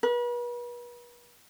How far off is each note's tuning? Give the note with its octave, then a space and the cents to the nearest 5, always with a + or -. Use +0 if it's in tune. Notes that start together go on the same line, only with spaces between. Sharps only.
B4 -40